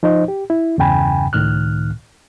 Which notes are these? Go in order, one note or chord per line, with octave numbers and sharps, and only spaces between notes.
F3 D#4 C5 D#5
G4
E4
E2 G2 C#3 G5 G#5 B5
C#2 A2 D#3 F6 F#6